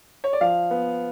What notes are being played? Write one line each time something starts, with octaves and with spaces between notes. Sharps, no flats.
C#5
D5
F3 F5
B3